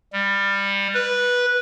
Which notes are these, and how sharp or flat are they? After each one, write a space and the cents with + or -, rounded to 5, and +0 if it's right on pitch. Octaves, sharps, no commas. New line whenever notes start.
G3 +20
B4 -10